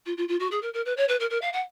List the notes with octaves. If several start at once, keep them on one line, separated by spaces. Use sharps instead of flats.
F4
F4
F4
F#4
G#4
A#4
A#4
B4
C#5
B4
A#4
A#4
F5
F#5